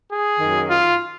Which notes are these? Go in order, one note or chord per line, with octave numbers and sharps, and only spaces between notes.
G#4
F#2 D#3 F#3
F4